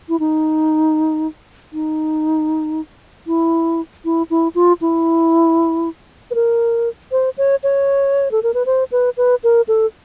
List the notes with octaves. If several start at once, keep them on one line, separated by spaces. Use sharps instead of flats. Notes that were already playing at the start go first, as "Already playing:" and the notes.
E4
D#4
D#4
E4
E4
E4
F4
E4
B4
A#4
C5
C#5
C#5
A4
A#4
B4
C5
B4
B4
A#4
A4